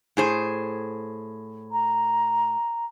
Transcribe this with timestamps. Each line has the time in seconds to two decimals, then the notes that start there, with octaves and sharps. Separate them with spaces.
0.17 A2 G#4 C5
1.71 A#5